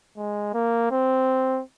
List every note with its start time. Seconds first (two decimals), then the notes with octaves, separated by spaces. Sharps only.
0.17 G#3
0.54 A#3
0.91 C4